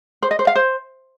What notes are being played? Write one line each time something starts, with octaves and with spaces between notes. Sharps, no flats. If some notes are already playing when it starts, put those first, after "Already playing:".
C5
D#5
C5
F5
C5